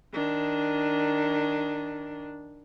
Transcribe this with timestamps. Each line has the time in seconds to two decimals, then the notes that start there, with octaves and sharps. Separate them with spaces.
0.13 D#3 D4